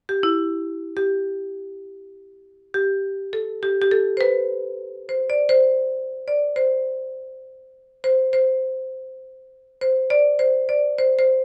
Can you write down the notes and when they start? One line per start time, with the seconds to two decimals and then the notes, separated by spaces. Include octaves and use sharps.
0.09 G4
0.23 E4
0.97 G4
2.74 G4
3.33 A4
3.63 G4
3.82 G4
3.91 A4
4.17 C5
4.21 B4
5.09 C5
5.30 D5
5.49 C5
6.28 D5
6.56 C5
8.04 C5
8.33 C5
9.81 C5
10.10 D5
10.39 C5
10.69 D5
10.98 C5
11.19 C5